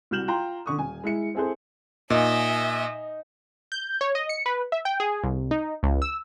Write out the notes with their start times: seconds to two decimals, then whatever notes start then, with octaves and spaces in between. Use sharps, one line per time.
0.11 C2 F#4 F6 G6 E7 F#7
0.28 F4 G5 A#5 C6
0.66 D3 C#6 D#6
0.78 D#1 G#5
1.04 G#3 E4 C#7
1.35 C4 E4 G#4 A4 C5
2.10 A#2 D#4 D#5 E5 G#5
3.72 G6
4.01 C#5
4.15 D#5
4.29 C#7
4.46 B4
4.72 E5
4.85 G5
5.00 G#4
5.24 C2
5.51 D#4
5.83 C#2
6.02 E6